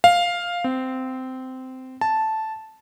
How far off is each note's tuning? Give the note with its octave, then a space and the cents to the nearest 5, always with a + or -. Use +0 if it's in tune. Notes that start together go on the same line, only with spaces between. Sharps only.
F5 +5
C4 -15
A5 -5